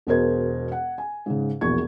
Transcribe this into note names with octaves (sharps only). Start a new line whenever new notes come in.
E1 B2 G#4 A#4 C5 G#6
F#5
G#5
G#2 C#3
E1 A#1 E2 C#6 G#6